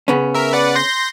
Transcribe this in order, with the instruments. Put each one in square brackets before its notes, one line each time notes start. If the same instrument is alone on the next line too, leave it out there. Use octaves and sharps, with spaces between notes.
[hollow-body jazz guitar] C#3 B3 C#4
[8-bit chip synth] A#4 E5
B4 D5 F#5
C6 G6 A#6